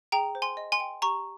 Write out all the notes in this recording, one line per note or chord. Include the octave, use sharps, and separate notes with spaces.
G#4 G5 A#5
C5
G#5 C6
D#5
G#5 C6
G5
G4 A#5 C#6